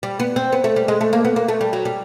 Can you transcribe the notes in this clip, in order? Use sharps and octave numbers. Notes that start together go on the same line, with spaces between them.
G3
B3
C4
B3
A3
G3
G#3
A3
A#3
B3
A#3
A3
G3
F#3
G3